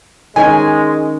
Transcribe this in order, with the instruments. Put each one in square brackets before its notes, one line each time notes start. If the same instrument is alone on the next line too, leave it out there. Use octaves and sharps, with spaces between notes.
[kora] D#3 C#4 [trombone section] G#3 [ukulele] G#5